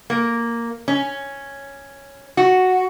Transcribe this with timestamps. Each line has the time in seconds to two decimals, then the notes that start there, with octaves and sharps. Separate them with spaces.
0.10 A#3
0.88 C#4
2.37 F#4